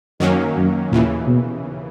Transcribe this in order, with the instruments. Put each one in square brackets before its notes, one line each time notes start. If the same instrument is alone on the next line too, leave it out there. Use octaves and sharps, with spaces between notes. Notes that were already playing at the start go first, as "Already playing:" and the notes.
[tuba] F#2 [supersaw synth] D#3 F#3 A#3 C#4
[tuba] F#2
[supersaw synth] D#2 C#3 E3 [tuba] A#2
[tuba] B2